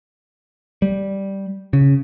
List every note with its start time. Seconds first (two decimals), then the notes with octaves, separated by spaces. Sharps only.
0.82 G3
1.73 C#3